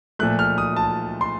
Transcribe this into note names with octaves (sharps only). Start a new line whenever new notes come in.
A#2 F3 A3 F#6
F6
D#6
A5
C6